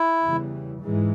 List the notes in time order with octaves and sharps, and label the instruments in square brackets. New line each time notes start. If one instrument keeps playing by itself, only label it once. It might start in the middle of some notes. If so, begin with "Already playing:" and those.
Already playing: [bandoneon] E4
[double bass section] E2 C#3 E3 G3
G#2 E3 G#3